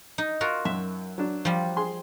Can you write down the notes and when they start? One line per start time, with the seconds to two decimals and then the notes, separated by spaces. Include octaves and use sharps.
0.18 D#4
0.41 F4 F#4 A#4
0.65 F#2 E5
1.18 F#3 D4
1.45 F3 G3
1.76 G#4 C6